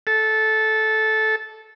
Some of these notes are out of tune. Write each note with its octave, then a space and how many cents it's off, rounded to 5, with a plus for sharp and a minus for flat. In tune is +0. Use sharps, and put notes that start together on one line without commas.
A4 -15